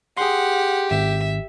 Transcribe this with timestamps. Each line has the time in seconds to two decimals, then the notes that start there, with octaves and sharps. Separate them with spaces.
0.17 G4 G#4 F#5 C6
0.91 G#1 E5